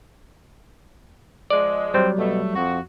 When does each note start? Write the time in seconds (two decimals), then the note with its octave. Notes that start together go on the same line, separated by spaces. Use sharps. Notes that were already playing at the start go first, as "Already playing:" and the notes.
1.50 F3 G#3 D5
1.94 F#3 G3 C4
2.18 B2 A3
2.55 F2 F#4